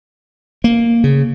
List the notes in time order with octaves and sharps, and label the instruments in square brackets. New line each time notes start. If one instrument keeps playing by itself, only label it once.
[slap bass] A#3
C#3